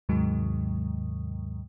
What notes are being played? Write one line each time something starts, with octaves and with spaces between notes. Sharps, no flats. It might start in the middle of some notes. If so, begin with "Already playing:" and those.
D#2 G#2 C3 D#3 F#3 G#3